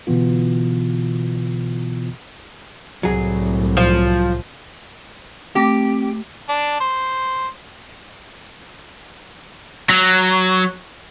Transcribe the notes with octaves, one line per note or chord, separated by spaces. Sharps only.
B2 D3 E3 B3 F4
C2 A2 F#3 G#4
F3
A3 C4 G4 D6 A#6
D4
C5
F#3